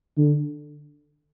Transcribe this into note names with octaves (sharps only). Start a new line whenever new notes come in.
D3